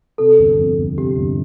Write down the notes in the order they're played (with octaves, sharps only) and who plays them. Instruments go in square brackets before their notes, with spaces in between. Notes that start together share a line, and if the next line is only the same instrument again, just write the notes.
[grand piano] C3 [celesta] A4
[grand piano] G1
F2
G1
[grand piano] C3 [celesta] G4
[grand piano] G1